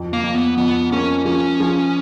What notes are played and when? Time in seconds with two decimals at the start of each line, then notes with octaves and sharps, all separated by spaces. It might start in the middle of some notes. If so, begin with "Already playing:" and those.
Already playing: F2
0.13 A#3
0.23 F2
0.35 B3
0.58 F2 B3
0.92 A#3 C#4
1.26 F3 C#4
1.60 F3